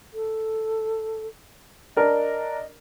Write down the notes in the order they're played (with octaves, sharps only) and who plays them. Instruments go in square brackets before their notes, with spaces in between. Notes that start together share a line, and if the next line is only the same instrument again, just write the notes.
[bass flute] A4
[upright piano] D4 A#4 [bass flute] D#5